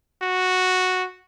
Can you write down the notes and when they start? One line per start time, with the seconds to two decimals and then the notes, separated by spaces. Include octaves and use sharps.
0.22 F#4